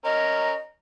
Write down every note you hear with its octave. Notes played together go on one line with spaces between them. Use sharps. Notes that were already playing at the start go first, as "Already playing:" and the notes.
C#4 A#4 D#5